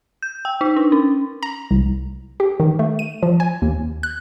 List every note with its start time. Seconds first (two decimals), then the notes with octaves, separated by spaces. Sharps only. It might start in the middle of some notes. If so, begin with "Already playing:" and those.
0.22 G6
0.45 G5
0.61 D#4
0.76 D4
0.92 C#4
1.43 A#5
1.71 C2
2.40 G4
2.60 D#3
2.79 A3
2.99 D#7
3.23 F3
3.40 G#5
3.62 D#2
4.03 F#6